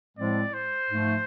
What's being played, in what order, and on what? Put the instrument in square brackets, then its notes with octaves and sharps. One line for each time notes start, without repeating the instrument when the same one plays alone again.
[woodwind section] A2 F3 G#3 C4 [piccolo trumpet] D5
[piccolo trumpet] C5
[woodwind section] G#2 F3 A3